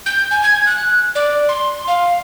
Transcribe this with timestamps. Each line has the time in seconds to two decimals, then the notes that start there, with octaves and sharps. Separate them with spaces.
0.06 G6
0.31 G#5
0.43 G#6
0.66 F#6
1.15 D5
1.49 C6
1.88 F5